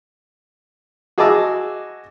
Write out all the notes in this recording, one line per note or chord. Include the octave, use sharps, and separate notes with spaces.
F#4 G#4 D#5 A5 D6 E6